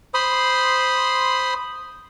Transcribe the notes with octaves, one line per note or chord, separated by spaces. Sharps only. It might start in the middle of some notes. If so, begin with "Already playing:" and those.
C5 B5 C6 D#6